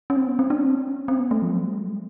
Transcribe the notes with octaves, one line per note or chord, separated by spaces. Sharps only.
C#4
C4
B3
C4
D4
C#4
C4
C#4
C4
B3
A3
F3
F#3
G3
G#3
A3